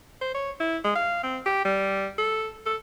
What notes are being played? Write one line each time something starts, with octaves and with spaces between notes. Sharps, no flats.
C5
C#5
E4
G#3
F5
C4
G4
G3
A4
A4